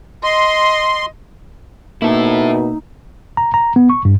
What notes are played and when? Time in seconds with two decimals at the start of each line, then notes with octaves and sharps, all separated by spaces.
0.24 D#5 C6
2.02 B2 A#3 D#4 E4 A4 E5
3.37 A#5
3.54 A#5
3.76 B3
3.90 C#6
4.05 G2